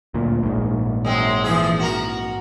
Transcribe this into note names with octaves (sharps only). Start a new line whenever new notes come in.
D2 A#2
A#1 G#2
F#2 G#3 C4
E3 F3 G#4
F#4 A#4